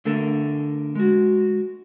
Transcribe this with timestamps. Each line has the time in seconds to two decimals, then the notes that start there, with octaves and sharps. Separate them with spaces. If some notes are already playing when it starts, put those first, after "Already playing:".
0.05 D3 A3 A4 A#4
0.95 G#3 F#4